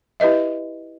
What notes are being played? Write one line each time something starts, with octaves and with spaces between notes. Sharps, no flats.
E4 G4 B4 D#5 E5